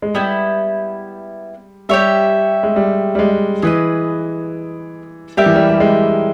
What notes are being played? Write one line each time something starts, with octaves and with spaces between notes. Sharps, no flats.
G#3
G3 B3 E4 G4
G3 G4 C#5 E5
G#3
G3
G3
G#3
E3 G#4 B4 D#5
G3 G4 A#4 E5
E3
G3
G3
G#3